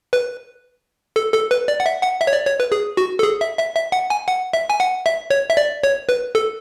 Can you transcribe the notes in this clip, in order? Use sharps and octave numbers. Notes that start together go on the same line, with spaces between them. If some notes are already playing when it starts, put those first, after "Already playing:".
B4
A4
A4
B4
D5
F#5
E5
F#5
E5
C#5
D5
C#5
B4
G#4
F#4
A4
G#4
E5
E5
E5
F#5
G#5
F#5
E5
G#5
F#5
E5
C#5
E5
D5
C#5
B4
A4